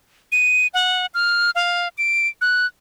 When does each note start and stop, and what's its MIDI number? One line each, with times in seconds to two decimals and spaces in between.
0.32 0.67 99
0.74 1.06 78
1.14 1.50 89
1.55 1.88 77
1.98 2.28 98
2.41 2.66 90